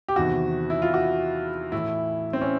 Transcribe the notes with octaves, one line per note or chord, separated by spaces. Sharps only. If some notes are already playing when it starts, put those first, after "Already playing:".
G4
E2 C3 D#3 F#4
E4
F4
F#4
A2 E3 E4
C4
C#4